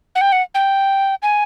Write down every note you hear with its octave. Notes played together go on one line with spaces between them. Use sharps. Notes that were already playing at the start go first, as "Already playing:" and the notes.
F#5
G5
F#5
G5
G#5